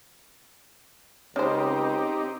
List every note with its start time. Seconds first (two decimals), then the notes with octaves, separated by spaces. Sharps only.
1.36 C#2 C4 C#4 D#4 G4 C5